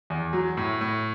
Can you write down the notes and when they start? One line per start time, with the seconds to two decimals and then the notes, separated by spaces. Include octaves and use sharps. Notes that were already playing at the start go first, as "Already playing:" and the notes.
0.10 E2
0.33 F#3
0.57 A2
0.81 A2